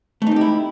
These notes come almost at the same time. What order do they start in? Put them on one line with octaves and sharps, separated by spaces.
A3 D#4 C4 G4 E4